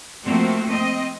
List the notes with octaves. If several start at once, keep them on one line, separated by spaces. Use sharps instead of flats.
F3 A3 A#3 C4 F#4
C4 D#5